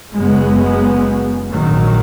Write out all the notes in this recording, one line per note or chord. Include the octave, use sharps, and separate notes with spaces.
F#1 F#2 C#3 G#3 B3
A#1 G#2 D#3 F#3